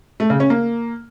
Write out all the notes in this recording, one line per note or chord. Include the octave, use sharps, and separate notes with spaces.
A3
C#3
C#4
A#3